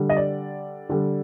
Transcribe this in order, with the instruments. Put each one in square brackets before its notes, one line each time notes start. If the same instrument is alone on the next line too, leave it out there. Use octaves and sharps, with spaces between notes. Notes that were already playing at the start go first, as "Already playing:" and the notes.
Already playing: [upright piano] D3 G3
D#5
D5
D3 G3